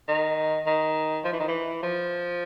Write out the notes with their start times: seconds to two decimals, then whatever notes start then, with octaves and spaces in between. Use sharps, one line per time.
0.08 D#3
0.66 D#3
1.25 F3
1.33 E3
1.40 D#3
1.48 E3
1.83 F3